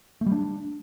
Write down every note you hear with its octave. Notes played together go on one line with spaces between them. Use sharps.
A3
G3
D4